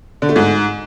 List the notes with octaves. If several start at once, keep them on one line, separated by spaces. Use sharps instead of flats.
D3
A3
G#2